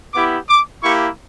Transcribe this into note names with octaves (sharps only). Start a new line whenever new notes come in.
B3 E4 G4 D6
D6
A#3 E4 G4 C#6